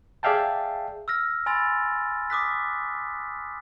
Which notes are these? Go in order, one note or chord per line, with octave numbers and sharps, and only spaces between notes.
G#4 D5 E5 F5 G5 A5
E6 F6 A#6
G#5 B5 C6 E6 A6
D6 D#6 F#6 B6